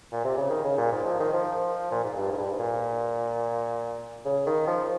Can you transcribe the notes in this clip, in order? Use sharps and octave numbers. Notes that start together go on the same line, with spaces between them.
A#2
C3
C#3
D#3
C#3
A#2
G#2
F3
D#3
F3
A#2
G#2
G2
G#2
G2
G#2
A#2
C#3
D#3
F3